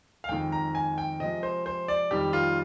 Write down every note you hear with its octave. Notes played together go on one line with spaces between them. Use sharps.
F5
F2 D#3 G#3 G5
A#5
G#5
G5
C3 F3 G#3 D#5
C5
C5
D5
F2 D#3 G3 G4
F4